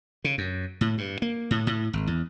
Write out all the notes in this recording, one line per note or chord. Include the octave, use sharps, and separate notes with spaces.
C#3
F#2
A2
G2
A#3
A2
A2
G#1
E2